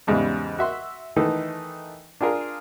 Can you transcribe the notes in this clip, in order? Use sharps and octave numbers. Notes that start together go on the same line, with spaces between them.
E2 G#2 C#3 G3
F#4 E5 C6
D#3 E3 A3 D#4 A4
D4 F4 G#4 A#4